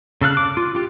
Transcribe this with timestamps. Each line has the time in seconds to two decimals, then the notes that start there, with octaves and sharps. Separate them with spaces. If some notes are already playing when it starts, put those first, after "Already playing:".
0.21 C#3 A4 F5 F#6
0.37 D6
0.57 F4
0.75 F4 G4